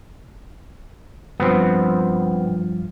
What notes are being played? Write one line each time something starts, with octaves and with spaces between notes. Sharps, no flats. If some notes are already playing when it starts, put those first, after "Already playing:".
G2 F3 B3 C4